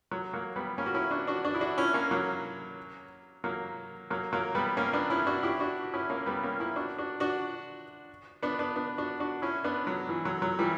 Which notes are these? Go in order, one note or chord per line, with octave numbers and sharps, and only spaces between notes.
F#3
F#3 A#3
G3 B3
A#3 C#4
F#4
C#4 E4
D4 F#4
D4 F#4
D4 F#4
E4
D4 F#4
C#4 E4
A#3 C#4
F#3 A#3
F#3 A#3
F#3 A#3
F#3 A#3
G3 B3
A#3 C#4
B3 D4
C#4 E4
D4 F#4
E4 G4
D4 F#4
F#4
C#4 E4
A#3 C#4
G3 B3
A#3 C#4
C#4 E4
D4 F#4
D4 F#4
D4 F#4
B3 D4
B3 D4
B3 D4
D4 F#4
D4 F#4
C#4 E4
B3 D4
F#3
E3
F#3
F#3
E3 G3